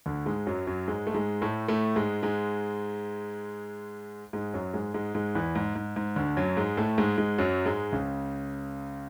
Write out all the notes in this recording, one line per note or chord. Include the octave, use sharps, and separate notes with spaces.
D2 D3
G#2 G#3
F#2 F#3
F#2 F#3
G#2 G#3
A3
G#2 G#3
A2 A3
A2 A3
G#2 G#3
G#2 G#3
G#2 G#3
F#2 F#3
G#2 G#3
G#2 G#3
G#2 G#3
E2 E3
G#2
G#2
G#2
D2 D3
F#2 F#3
G#2 G#3
A2 A3
G#2 G#3
G#2 G#3
F#2 F#3
G#2 G#3
C#2 C#3